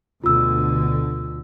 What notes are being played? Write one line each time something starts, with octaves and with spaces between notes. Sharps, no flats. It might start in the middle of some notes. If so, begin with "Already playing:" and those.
D2 B2 D3 F4 E6